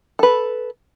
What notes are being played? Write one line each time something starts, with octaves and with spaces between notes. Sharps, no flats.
A4 B4